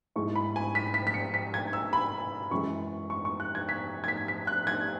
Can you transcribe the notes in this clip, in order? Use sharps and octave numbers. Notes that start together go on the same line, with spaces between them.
G#2 G#3 E4 C#6
B5
G#5
B6
B6
B6
C#7
B6
G#6
E6
B5
F#2 E3 G#3 C#6
C#6
C#6
F#6
G#6
B6
G#6
B6
B6
F#6
G#6